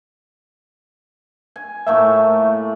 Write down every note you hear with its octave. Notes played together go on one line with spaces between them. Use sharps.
G#5
A2 A3 A#3 E5